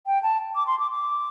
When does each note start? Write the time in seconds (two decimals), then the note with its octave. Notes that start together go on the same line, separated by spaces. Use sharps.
0.06 G5
0.23 A5
0.55 D6
0.67 C6
0.79 D6
0.91 D6